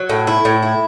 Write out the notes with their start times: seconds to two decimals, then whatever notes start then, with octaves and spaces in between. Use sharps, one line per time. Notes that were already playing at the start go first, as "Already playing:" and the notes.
Already playing: F#3
0.10 A2
0.27 E4
0.45 A2
0.62 E4